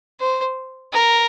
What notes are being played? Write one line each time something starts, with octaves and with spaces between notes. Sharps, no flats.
C5
A#4